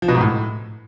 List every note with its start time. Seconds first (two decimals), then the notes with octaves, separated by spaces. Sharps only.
0.02 F3
0.08 B2
0.15 G#2
0.21 A2